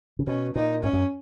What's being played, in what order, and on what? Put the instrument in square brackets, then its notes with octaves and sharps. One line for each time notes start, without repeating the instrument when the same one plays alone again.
[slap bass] C#3
[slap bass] B2 [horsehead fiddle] C#4
[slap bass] A#2 [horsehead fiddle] D#4
[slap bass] G#2 [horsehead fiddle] C#4
[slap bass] F#2